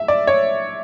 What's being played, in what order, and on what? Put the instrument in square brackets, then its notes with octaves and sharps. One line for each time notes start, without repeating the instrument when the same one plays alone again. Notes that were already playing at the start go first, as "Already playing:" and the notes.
Already playing: [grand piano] E5
D5
C#5